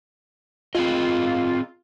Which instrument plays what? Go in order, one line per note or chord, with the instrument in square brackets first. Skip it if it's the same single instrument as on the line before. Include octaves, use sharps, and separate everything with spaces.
[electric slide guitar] C4 G#4 D#5 [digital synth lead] F4